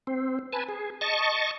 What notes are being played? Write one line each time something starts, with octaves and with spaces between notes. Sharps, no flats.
C4
B4 G#5 A5
G#4
D#5 A5 C#6